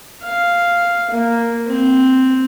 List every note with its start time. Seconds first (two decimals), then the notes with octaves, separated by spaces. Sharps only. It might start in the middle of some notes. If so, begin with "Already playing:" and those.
0.23 F5
1.11 A#3
1.67 C4